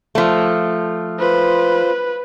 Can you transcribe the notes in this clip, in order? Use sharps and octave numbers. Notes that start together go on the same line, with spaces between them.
F3 A3
F4 B4 C5